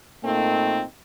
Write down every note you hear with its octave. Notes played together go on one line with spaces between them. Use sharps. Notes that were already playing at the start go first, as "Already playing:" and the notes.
A#2 A3 A#3 C4 D#4